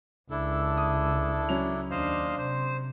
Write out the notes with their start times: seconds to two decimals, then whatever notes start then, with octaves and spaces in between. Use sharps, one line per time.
0.31 C#2 D4 E4 A4
0.78 D#6
1.49 F#3 C#4 F7
1.91 D#2 D4 C5 D#5 F5
2.38 C3 C5